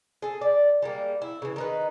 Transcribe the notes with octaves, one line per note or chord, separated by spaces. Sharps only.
G#4 A4
D5
G3 G#3 A#3
E4
C#3 E3
D#3 D#4 B4